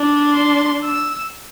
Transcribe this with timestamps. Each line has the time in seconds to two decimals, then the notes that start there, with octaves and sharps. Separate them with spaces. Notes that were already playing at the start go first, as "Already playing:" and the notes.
Already playing: D4
0.34 C6
0.84 E6